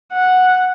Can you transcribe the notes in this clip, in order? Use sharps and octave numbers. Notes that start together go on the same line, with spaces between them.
F#5